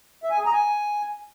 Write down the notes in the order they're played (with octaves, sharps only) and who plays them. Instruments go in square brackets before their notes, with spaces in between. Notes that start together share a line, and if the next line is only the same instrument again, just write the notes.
[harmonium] E5
G#5
G#4
A#5
G#5